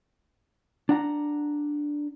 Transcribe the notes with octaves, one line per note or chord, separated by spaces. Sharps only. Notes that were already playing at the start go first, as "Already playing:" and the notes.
D4 F#5 A#5